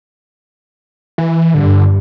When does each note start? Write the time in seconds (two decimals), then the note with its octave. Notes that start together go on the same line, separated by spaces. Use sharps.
1.18 E3
1.54 G2 D3